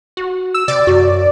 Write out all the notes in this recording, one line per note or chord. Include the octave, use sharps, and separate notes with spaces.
F#4
E6
C3 D5
F#2 F#4